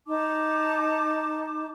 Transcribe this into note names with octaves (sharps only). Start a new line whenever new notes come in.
D#4 A5 D6